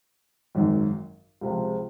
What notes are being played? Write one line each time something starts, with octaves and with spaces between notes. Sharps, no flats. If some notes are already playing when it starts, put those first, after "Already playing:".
G#1 F#2 D#3
C#2 C3 F3 G#3 C4